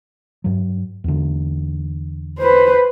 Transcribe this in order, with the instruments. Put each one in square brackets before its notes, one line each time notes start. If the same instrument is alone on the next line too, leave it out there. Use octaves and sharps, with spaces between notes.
[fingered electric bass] G2 F#3
E2 D3
[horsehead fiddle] B4 C5